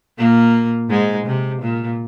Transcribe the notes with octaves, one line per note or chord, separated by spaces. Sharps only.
A#2 A#3
G#2 G#3
C3
A#2